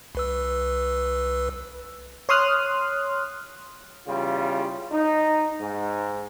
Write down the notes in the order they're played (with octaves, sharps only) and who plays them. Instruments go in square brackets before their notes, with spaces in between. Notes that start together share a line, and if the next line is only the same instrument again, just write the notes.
[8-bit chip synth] C2 B4 E6
[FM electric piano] C#5 C6 D#6 F6 F#6
[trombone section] E2 C#3 G3 F4
D#4
G#2